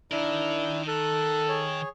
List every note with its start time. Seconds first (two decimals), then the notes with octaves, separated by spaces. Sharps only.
0.11 D#3 D4 E4 A#4
0.88 A4 F#6
1.48 G#4 C#5